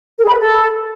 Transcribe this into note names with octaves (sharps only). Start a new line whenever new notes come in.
A#4
G#4
B5
B4
A4